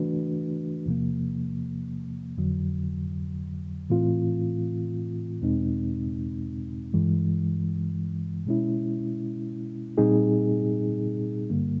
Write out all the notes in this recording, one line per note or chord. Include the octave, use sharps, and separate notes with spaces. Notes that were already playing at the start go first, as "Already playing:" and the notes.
Already playing: E3 A3 D4 F#4 B4
E2 C3 F3 A#3
F2 D3 F#3
A2 E3 A3 C4 F4
E2 B2 G#3 C4 D#4
G2 E3 G#3
B2 G#3 C#4 E4
A#2 G3 C4 D#4 G#4
G2 D3 G3 A#3